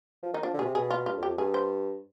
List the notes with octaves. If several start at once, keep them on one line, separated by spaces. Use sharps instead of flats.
F3
D#3 D#4
F3 D4
D3
B2 G#4
C3
B2 G#4
F4
G2 F4
F2
G4
F2
G2 G#4
C5